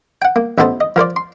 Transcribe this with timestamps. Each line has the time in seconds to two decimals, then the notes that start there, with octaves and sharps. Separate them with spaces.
0.22 F#5 G5
0.36 A#3
0.58 A1 B3 D#4 A4 C5 A5
0.81 D#5
0.96 F3 A#4 C5 D5
1.16 C6